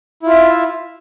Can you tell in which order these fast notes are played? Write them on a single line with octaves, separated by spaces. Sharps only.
E4 F4 E5